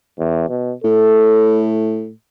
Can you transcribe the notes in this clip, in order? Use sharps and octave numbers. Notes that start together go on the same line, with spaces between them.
E2
B2
A2 A4